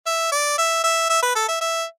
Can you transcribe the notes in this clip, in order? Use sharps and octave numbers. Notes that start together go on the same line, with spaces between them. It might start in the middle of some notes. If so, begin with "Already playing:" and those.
E5
D5
E5
E5
E5
B4
A4
E5
E5